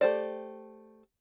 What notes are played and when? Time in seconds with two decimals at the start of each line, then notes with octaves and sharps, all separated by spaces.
0.01 A3 G4 C5 D5